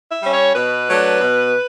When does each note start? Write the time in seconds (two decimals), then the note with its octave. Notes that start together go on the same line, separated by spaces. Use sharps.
0.11 E5
0.22 G3 C#4
0.33 C#5
0.55 B2 B4
0.88 F#3 A3 D4
1.21 B2